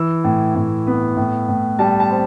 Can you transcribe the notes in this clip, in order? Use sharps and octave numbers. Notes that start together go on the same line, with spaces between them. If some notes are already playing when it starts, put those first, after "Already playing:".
Already playing: E3 E6
A2
A2
B3
A2
A2
G3 A5
A5
C4